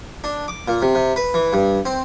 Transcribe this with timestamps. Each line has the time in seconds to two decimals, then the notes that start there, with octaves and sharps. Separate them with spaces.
0.24 D4
0.48 D6
0.68 A#2
0.82 C3
0.95 C3
1.16 B4
1.34 E3
1.53 G2
1.85 C4